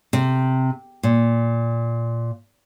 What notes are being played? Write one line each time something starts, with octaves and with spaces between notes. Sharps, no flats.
C3
A#2